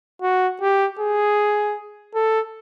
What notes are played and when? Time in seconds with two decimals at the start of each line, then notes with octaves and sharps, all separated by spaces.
0.22 F#4
0.61 G4
0.99 G#4
2.14 A4